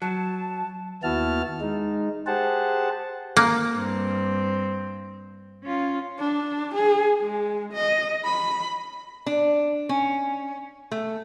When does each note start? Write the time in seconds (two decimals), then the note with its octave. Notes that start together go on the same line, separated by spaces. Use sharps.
0.02 F#3 A5
1.03 D#2 B3 E4 F#4 A5 F6
1.61 G#3 D#4
2.27 G4 G#4 C5 F#5 A5
3.37 A#3
3.75 G2 C4
5.63 C#4 F4
6.19 D4
6.74 G#4
7.21 G#3
7.73 D#5
8.25 B5
9.26 D4
9.89 C#4
10.91 A3